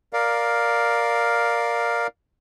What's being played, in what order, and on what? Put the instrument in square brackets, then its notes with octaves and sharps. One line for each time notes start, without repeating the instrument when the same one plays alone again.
[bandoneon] A#4 D5 F5